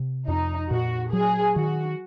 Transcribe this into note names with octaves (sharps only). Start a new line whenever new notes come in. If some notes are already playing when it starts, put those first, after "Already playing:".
Already playing: C3
F2 D#4
A#2 F#4
F#3 G#4
D#3 F#4